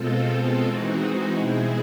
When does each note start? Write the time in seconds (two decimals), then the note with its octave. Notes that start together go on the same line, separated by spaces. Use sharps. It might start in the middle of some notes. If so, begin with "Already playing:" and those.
Already playing: B2 G#3 C4 F4 A4
0.63 E3 G#3 C4 D#4 F#4
1.38 B2 G#3 C4 E4 G#4